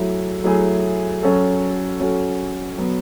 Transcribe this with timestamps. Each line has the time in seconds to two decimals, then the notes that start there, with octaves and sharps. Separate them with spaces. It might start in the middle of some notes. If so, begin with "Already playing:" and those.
Already playing: F#3 A3 E4 G#4
0.44 F#3 A3 E4 G#4
1.22 F#3 C#4 F#4 A4
2.00 F#3 C#4 F#4 A4
2.78 F#3 B3